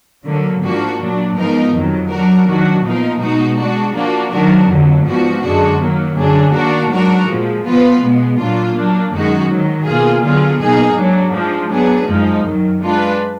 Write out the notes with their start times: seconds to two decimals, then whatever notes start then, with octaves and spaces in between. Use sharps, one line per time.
0.25 D3 F#3 A#3
0.62 G#2 F3 A#3 D4 F#4
0.99 A#2 F#3 D4
1.36 G#2 F3 B3 D#4 A#4
1.73 F2 D#3 F#3
2.09 F#3 D4 F#4 A#4
2.47 D#3 F#3 D4 F#4
2.83 A#2 F3 B3 D#4 A#4
3.20 B2 G#3 D#4 F#4
3.58 G#3 D4 F#4
3.94 F3 A#3 D4 F#4
4.32 D#3 F#3 D4 F#4 A#4
4.68 F2 D3 F#3
5.05 G#2 F3 B3 D4 F#4
5.41 F#2 D3 G#3 D4 F#4
5.79 D#3 F#3 A#3
6.15 F#2 D3 F#3 D4 G#4
6.53 D#3 A#3 D4 F#4 A#4
6.90 G#2 F#3 D4 F#4 A#4
7.27 A#2 F3 G#3
7.64 A#2 F3 B3 F4 B4
8.00 B2 G#3 B3
8.37 A#2 F#3 A#3 D4 F4
8.74 F#3 A#3 D4
9.11 F#2 D#3 G#3 D#4 F#4
9.49 G#2 D#3 F#3
9.85 B2 A#3 F4 G#4
10.22 D3 F#3 B3 F4 G#4
10.59 B2 A#3 D#4 G#4
10.96 G#2 F#3 D4
11.33 G#2 F3 G#3 D4
11.70 F#3 B3 D4 G#4
12.07 F#2 F3 G#3 D#4
12.43 F#2 D#3 F#3
12.81 G#3 D4 F4 B4